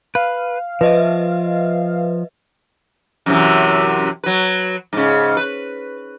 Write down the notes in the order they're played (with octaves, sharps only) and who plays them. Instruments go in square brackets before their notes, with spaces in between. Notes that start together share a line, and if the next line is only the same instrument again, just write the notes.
[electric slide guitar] B4 [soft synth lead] F5
[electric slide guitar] F3 [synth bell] B4 D#5 E5
[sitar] F#2 C3 E3
F#3 B4
G#2 C#3
B4